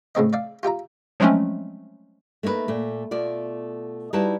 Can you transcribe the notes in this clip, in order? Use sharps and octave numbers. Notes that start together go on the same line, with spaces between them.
A2 C#3 C4 D#5
D5 E5 F5
F4 G4 E5 A#5
F3 F#3 G#3 A3 C4 C#4
A3 A#3 D#4 E4 B4
A#2 A3
B2 A3 F4 D5
G3 D#4 E4 F#4 B4 A5